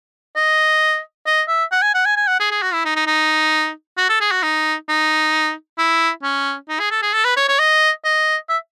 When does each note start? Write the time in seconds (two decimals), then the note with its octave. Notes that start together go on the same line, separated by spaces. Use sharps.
0.36 D#5
1.26 D#5
1.48 E5
1.72 F#5
1.82 G#5
1.94 F#5
2.06 G#5
2.16 G#5
2.27 F#5
2.40 G#4
2.51 G#4
2.62 F#4
2.73 E4
2.85 D#4
2.96 D#4
3.06 D#4
3.97 F#4
4.09 A4
4.21 G#4
4.31 F#4
4.42 D#4
4.88 D#4
5.78 E4
6.23 C#4
6.69 D#4
6.79 G#4
6.91 A4
7.02 G#4
7.13 A4
7.24 B4
7.37 C#5
7.48 C#5
7.59 D#5
8.04 D#5
8.49 E5